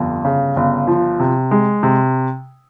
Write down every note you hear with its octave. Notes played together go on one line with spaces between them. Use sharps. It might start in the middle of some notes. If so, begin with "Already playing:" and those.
Already playing: G1 F2
C#3
G1
F3
C3
G#3
C3